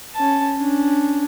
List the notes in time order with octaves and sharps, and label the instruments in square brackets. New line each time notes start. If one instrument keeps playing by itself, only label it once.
[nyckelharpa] C#4 A5
C#4 D4